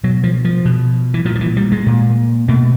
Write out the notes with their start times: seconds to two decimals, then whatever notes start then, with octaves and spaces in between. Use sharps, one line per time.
0.04 B2 F#3
0.23 F3
0.45 F3
0.65 B2
1.14 E3
1.25 A#2 F3
1.35 F3
1.41 E3
1.57 G3
1.72 G#3
1.86 A#2
2.48 B2 A3